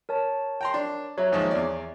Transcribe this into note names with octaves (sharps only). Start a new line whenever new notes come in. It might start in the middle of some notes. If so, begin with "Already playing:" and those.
A#4 C#5 A5
G5 A#5 C6
D4
F#3 C#5 E5 A#5
D#2 G#2 F3
E2 D5